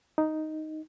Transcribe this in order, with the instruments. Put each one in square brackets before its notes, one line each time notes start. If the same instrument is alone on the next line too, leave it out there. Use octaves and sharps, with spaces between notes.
[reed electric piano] D#4